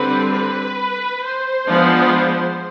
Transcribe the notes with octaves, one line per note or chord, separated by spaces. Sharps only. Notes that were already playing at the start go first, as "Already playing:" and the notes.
Already playing: D3 G3 C4 B4
B4
C5
F3 G#3 B3 D4